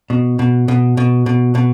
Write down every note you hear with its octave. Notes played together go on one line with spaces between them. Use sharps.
B2
B2
B2
B2
B2
B2